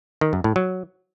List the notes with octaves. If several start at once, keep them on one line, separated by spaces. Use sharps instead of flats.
D#3
F#2
A2
F#3